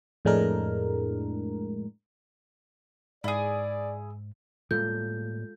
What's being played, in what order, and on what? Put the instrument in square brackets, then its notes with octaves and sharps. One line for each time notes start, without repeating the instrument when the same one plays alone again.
[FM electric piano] F2 A2 G#3 D4 A#4
[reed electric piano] G#2 [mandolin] E4 G#4 [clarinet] D5
[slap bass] A2 G3 A#3 [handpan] G#3 F4 A4 [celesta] G6